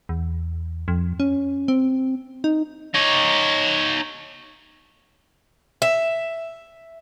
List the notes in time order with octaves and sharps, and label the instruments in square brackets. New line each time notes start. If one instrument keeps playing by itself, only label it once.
[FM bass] E2
F2
C#4
C4
D#4
[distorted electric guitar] D#4 C#5
[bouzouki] E5